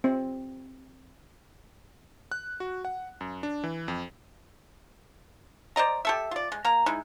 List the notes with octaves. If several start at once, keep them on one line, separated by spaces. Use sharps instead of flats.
C4
F#6
F#4
F#5
F#2
D4
E3
F2
C5 D5 D#5 A#5
G4 A4 E5
F4 D5
G#3
A#3 A#5
G#3 D#4 E4